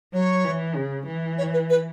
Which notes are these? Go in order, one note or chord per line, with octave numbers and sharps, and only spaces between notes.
F#3 C#5
E3
C#3
E3
C#5
B4
B4